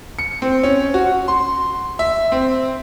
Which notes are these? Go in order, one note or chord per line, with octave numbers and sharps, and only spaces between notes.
C#7
C4
C#4
F#4
C6
E5
C4